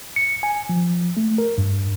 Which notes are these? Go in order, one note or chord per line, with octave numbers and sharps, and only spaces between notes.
C#7
G#5
F3
A3
A#4
G2